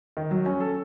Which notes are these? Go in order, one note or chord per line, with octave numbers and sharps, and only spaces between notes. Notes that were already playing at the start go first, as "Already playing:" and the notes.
D#3
F#3
C#4
A4